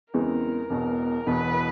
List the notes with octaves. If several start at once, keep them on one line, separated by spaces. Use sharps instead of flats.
E2 C#3 E3 G#3 C4 A#4
E1 E2 B2
E1 E2 B2 B4